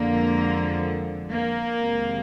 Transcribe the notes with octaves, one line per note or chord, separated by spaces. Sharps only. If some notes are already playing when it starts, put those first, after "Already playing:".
Already playing: F2 D3 F3 G#3 A#3
A#3
F2 C3 D#3 G#3